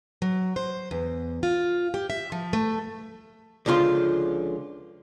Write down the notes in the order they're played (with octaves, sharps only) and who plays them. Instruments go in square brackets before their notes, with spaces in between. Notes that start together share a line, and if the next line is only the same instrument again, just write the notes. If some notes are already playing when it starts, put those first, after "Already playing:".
[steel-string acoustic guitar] F#3
C5
E2
F4
G4
E5
F3
A3
[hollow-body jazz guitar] C#2 D3 F3 F4 C6